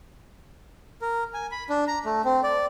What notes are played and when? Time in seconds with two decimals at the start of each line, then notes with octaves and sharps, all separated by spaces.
1.02 A#4
1.34 G#5
1.51 B5
1.69 D4
1.88 A#5
2.05 A3
2.25 C4
2.43 D5